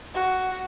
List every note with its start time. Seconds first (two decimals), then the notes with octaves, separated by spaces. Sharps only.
0.15 F#4